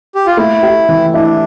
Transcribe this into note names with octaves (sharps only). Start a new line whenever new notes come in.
G4
F4
A3 E4
G4
E3
D4 E4